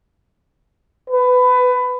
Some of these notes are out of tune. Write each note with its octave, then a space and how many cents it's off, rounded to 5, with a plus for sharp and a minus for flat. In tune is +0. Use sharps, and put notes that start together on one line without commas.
B4 +20